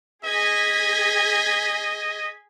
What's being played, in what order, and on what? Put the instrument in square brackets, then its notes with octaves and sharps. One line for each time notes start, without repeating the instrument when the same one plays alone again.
[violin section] G#4 G#6 B6 [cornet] D#5